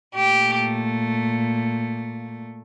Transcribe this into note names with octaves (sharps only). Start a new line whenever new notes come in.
A#2 A3 G4